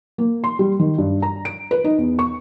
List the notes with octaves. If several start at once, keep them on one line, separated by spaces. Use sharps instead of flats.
A#3
C6
G3
D#3
G2
A#5
D7
B4
D#4
E2
C#6